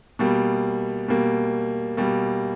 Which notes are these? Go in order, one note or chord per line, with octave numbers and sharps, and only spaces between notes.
B2 G3 A#3
B2 G3 A#3
B2 G3 A#3